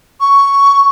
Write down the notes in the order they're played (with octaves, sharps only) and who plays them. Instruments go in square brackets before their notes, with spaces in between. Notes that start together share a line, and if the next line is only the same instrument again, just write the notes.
[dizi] C#6